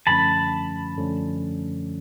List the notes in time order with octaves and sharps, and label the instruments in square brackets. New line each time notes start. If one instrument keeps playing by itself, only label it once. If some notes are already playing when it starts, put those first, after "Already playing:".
[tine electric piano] F#2 D3 F3 A3 C#4 [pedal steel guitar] A5 B5
[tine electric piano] F#2 D3 F3 A3 C#4